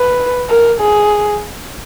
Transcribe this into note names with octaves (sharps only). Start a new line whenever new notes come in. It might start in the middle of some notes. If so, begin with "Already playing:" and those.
Already playing: B4
A#4
G#4